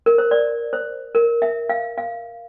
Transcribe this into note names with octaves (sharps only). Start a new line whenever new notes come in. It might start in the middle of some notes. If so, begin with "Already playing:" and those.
A#4
C5
D5
C5
A#4
E5
F5
F5